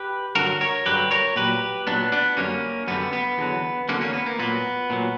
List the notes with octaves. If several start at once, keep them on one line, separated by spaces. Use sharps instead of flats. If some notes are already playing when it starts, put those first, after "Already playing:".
Already playing: G4 B4
G2 D3 F#3 F#4 A#4
A#4 C#5
G2 D3 F#3 G4 B4
A#4 C#5
A#2 F#3 G4 B4
A#2 F#3 B3 D4
B3 D4
F#2 D3 G3 A#3 C#4
F#2 D3 G3 B3
B3
E2 D3 F#3
E2 D3 F#3 A#3 C#4
A#3 C#4
B3
A#3
A#2 F#3 B3
A#2 F#3